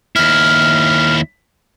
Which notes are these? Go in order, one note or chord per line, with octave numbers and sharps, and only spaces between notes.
D#2 E4 F6